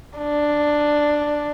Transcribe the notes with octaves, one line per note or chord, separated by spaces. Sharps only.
D4